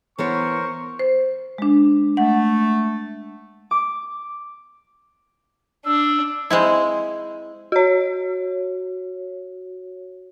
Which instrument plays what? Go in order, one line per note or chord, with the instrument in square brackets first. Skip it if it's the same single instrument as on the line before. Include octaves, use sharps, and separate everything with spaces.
[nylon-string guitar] E3 B3 C#5 [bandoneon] A#4 C5 [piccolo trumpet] C#6
[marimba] C5
G#3 D4
[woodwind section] A3 [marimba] F#5
[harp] D6
[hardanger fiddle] D4 [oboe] E6
[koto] G#3 C4 E4
[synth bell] F#4 C#5